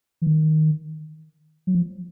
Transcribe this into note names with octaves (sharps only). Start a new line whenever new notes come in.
E3
D#3
F#3
F3